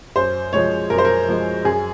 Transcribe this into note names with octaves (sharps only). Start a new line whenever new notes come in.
F#2 C5
F3 G#3 C#5
F#2 A#4
C5
A#4
F3 G#3
F#2 G#4